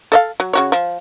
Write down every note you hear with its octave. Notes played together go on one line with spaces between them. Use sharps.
A4 D#5 F5
F#3
C#3 F#4 C#5
F3